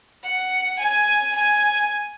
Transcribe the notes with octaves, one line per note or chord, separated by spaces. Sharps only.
F#5
G#5
G#5